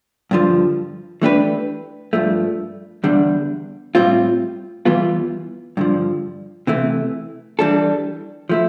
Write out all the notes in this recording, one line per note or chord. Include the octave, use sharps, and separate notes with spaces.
G2 D3 F3
E3 A3 D4 G4 B4
G2 F3 A3
E2 D3 G3 D4
A2 G3 C4 F4
E3 G3 B3 F4
G2 D3 F3
C3 E3 A3
E3 G3 D4 A4
F3 A3 E4